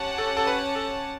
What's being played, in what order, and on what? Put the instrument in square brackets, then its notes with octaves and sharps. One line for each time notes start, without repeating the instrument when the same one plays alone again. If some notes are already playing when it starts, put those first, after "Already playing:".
Already playing: [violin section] C#4 G4 C#5 F#5 A5
[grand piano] A4
A4
B4
A4